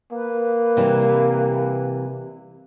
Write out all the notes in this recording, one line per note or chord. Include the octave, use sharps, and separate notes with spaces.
A#3 B4
C3 E3 G3